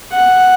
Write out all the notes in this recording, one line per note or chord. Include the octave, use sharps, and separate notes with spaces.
F#5